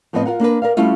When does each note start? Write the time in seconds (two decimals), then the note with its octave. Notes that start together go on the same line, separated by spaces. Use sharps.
0.13 A2 F3 B3 C4 B4 D#5
0.26 F4 A#4 F#5
0.40 A#3 D4 A#4 B4
0.62 A#4 D5 F5
0.77 G3 A3 C#4 E4 F4